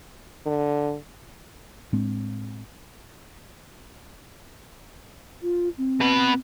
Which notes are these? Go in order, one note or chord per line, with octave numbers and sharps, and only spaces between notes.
D3
A2 G#3 C4 D4
F4
C4
B2 B4